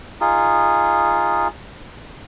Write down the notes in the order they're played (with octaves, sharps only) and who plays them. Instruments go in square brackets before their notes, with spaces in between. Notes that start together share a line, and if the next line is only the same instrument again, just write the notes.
[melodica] D#4 F4 G#4